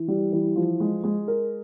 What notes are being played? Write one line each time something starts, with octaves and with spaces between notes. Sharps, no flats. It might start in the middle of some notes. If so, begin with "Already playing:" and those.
Already playing: E3
G3
E3
F3
G#3
G#3
A#4